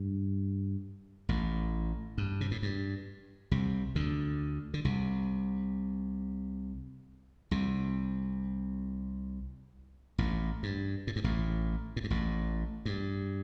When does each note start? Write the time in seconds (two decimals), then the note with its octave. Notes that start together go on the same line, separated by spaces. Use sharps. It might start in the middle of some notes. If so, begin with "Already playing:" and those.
Already playing: G2
1.29 A1 A2
2.18 G2
2.41 C3
2.51 A2
2.62 G2
3.51 C2 C3
3.95 D2 D3
4.74 D3
4.85 C2 C3
7.51 C2 C3
10.18 A1 A2
10.63 G2
11.07 A2
11.16 G2
11.24 A1 A2
11.96 A2
12.04 G2
12.10 A1 A2
12.85 G2